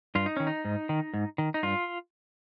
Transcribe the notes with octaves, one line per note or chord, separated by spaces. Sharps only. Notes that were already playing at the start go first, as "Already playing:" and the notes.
G2 F4
D#4
D#3 C#4
D#4
G#2
D#3
G#2
D#3
D#4
G2 F4